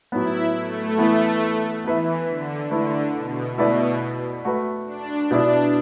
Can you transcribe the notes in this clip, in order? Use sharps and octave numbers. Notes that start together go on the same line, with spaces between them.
A2 F#3 B3 E4
A3
E3 B3 E4
E3 B3 E4 B4 E5
D3
D3 A3 E4 B4
B2
B2 A3 E4 B4 D5
A3 F#4 B4
D4
B2 B3 D4 E4 D5